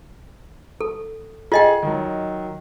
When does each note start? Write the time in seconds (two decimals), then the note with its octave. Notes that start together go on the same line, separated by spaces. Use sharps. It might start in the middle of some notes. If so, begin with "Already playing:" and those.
0.81 A4
1.52 F4 G#4 D#5 G5
1.83 D#3 F#3